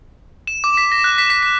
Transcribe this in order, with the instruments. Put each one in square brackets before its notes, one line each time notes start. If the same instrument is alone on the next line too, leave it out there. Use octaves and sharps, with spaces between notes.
[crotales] E7
D6
B6
A#6
F#6
B6
B6
B6